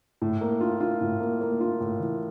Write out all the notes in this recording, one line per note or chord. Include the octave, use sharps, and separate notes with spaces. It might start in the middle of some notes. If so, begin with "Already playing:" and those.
A2
A#3
F4
F4
A2
A#3
A#3
F4
A2
E3